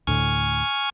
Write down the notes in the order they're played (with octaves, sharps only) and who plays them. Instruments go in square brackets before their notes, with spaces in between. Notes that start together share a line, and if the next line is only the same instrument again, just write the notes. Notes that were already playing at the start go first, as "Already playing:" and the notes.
[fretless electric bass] D2 A2 D3 [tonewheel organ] G#5 C#6 F6